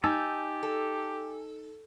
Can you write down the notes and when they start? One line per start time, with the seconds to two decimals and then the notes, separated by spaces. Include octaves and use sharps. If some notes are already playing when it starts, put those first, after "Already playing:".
0.04 D#4 G4 G#5 A5 E6
0.63 A4